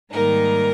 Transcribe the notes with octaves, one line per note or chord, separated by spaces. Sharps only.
G#2 D#3 G3 A#3 D#4 A#4